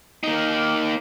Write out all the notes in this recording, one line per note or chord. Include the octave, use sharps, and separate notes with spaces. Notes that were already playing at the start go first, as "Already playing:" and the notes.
A#3 D#4